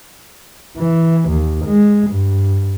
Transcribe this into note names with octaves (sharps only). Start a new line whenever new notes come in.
E3
D#2
G#3
G2